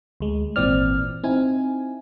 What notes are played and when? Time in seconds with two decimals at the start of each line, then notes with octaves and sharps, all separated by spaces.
0.20 D2 G#3
0.56 G#1 A#2 E3 C4 D5 F6
1.24 C4 D#4 E4 G#5